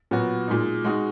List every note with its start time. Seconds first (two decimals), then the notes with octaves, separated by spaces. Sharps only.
0.11 A#2 F#3 B3 F#4
0.48 A#2 G#3 D#4
0.84 G#3 D#4 F#4